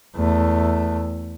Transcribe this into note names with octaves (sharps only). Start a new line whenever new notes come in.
E2 A3